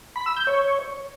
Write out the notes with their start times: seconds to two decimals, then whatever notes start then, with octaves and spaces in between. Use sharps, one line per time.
0.16 B5
0.26 E6
0.37 G6
0.47 C#5